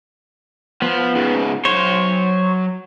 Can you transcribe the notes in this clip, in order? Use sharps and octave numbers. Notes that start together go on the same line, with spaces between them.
F3 B3
G#2 C#3
F#3 C5 C#5 C6